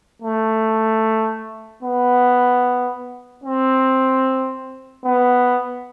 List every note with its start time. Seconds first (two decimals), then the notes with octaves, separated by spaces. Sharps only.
0.22 A3
1.83 B3
3.44 C4
5.05 B3